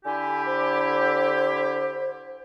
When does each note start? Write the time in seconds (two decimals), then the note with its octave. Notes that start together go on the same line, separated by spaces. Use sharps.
0.05 D3 E4 G4 G#5
0.46 C5